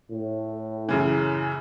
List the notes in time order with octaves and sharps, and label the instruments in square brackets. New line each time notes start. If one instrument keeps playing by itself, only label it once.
[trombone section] A2
[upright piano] F#2 C#3 E3